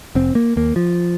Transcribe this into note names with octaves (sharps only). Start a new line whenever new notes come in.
F1 C4
A#3
D#2 A#3
F3